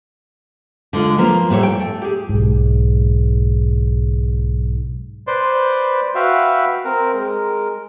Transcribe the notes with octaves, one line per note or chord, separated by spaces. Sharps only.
D3 G#3 F4
F3 A#3 B3 F4
A2 G3 A4 C#5
G5
A3
G4 G#4
B1 G#2
B4 C5 D5 C6
F#4 B4 E5 F5 G5
C4 A#4
G#3 A#4